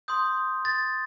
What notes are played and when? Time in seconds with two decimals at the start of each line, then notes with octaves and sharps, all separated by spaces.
0.08 C6 D#6 G6
0.65 A6